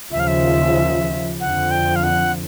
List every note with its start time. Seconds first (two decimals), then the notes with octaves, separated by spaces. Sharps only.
0.12 D#2 C#3 F3 E5
0.20 F5
0.27 E5
1.39 F2 D3 F3 F#5
1.71 G5
1.96 F5
2.03 F#5